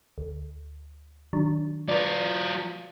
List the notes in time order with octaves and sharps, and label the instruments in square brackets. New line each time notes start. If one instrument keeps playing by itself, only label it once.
[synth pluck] D2
D#3 F#3 D4
[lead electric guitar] F#3 F4 [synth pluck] B4 D5